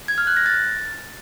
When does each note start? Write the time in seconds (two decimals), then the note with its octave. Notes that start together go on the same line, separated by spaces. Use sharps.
0.08 G#6
0.18 F6
0.27 F#6
0.37 A#6
0.46 A6